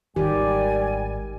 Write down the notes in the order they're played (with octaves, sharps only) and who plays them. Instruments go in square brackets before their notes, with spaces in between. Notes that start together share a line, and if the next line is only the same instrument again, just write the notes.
[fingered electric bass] D1 G#1 [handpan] D#3 G4 [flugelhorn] G3 [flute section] D5 G#5